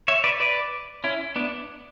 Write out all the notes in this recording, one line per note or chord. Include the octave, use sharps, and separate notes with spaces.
C#5 E5
B4 D5
B4 D5
C#4 E4
B3 D4